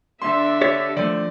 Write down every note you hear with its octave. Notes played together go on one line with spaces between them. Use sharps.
D3 D4 E5 C6
G4 C#5 D5
D#3 F3 A3 D5